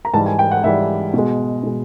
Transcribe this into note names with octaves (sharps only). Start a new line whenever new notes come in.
A#5
G#2 E3 G3 A5
G#5
G5
F#5
G#2 E3 G3 E5
B2 G#3
B2 G#3